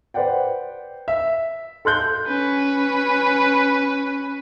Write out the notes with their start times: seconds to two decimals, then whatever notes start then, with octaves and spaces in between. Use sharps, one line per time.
0.14 B4 C5 D5 F#5 G5
1.08 E5
1.85 A4 C6 F#6 G6
2.27 C#4 B4